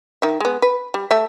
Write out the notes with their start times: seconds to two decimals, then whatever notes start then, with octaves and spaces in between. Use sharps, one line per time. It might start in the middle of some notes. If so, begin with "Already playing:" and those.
0.22 D#3 E5
0.40 G#3 B3
0.62 B4
0.94 G3
1.11 A3 E5